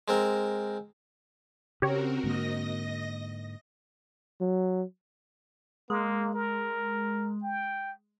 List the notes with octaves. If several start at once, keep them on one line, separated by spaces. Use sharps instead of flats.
G#3 C4 A#4
C#3 C4 F#4 G4 A#4 C#5
G#2 D3 A#3 D#5 A#6
F#3
G#3 A#3
A#4
G5